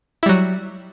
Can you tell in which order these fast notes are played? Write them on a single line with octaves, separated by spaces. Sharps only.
E4 G3 F#3